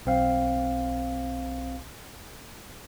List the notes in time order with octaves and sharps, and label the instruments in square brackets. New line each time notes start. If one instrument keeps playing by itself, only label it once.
[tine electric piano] B1 C4 F5